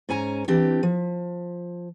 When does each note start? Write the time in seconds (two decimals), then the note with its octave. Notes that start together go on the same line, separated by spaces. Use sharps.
0.09 G#2 C#4 G#5 A#5
0.48 E3 C4 D4 G4
0.83 F3